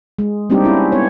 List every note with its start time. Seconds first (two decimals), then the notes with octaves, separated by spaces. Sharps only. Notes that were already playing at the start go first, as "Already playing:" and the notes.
0.19 G#3
0.50 G3 A#3 C4 D4 D#4 G4
0.65 C#4 E4
0.92 B3 C#5